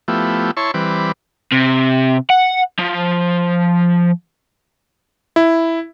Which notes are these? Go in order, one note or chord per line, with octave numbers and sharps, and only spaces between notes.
F3 A3 B3 E4 G4
E4 C#5 A5 C6 C#6
E3 G3 C4 B4 D6
C3
F#5
F3
E4